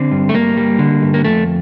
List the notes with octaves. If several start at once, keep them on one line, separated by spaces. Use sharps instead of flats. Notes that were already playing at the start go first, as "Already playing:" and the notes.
Already playing: D3 C4
G2
A3
G2 A#3
G3
D3
G2
A#3
F2 A3